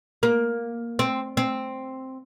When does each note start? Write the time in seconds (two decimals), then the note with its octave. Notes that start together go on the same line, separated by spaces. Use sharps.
0.23 A#3
0.99 C4
1.37 C4